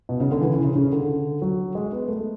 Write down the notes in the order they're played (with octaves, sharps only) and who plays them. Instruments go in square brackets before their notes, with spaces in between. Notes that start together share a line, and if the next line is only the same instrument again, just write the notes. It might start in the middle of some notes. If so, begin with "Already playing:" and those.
[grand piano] B2
C#3
D3
E3
C#3
C#3
C#3
D3
F#3
G#3
B3
A3